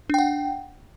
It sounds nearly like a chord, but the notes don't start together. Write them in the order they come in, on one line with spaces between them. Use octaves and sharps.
D4 G5 F#5